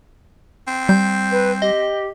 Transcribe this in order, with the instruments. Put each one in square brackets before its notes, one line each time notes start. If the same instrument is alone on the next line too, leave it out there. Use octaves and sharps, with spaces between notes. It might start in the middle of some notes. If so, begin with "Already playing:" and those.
[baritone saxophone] C4
[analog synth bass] G3 [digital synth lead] G6
[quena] B4
[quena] G4 [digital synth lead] D#5